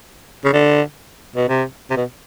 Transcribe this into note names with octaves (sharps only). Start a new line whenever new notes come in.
C#3
D3
B2
C3
C3
B2